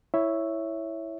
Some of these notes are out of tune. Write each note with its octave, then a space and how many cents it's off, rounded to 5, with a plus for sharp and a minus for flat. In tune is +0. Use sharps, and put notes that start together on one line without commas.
E4 +0 C#5 +0 E5 +0